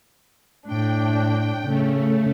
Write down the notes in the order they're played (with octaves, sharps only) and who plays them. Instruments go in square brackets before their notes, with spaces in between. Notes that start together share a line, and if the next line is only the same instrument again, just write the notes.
[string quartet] A2 D4 [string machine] G5
[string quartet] C#3 [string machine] A3